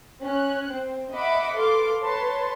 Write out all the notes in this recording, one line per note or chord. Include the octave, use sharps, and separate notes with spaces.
C#4 F#6
C4
D#5 E5 F#5 B5 D6
A4 B4 F5 C6 D6
B4 C#5 A5 C6